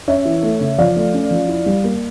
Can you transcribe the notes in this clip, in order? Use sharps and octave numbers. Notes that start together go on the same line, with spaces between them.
C#4 C#5 E5
E3
A3
C#3
F3 D5 F5
A3
C#4
F3
E4
G3
A#3